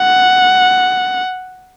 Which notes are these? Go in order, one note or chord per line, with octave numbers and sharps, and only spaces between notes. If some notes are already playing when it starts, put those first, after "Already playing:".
Already playing: F#5